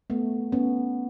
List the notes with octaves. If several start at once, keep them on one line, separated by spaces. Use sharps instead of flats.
A3 B3
B3 C#4